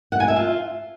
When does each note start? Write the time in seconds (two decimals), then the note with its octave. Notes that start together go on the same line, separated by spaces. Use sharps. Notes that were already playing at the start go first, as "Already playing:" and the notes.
0.12 F#5
0.20 G#5
0.28 E5
0.36 F4